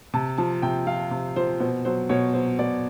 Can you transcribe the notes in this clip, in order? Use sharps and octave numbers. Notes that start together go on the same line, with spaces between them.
C3 A5
F3 A5
C3 G5
F3 F5
C3
F3 C5
B2 C5
F#3 C5
B2 C#5
F#3 C5
B2 D5